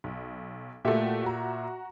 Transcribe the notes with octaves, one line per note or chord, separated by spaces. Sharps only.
B1
A#2 A3 F#4 G4 E5
F#4 A#5